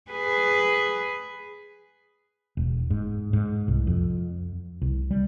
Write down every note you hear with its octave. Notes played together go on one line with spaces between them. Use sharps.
G#4 B4
E1
G#2
G#2
C2
F2
C2
G3